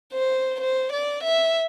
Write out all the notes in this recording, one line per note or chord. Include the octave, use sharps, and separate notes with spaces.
C5
C5
D5
E5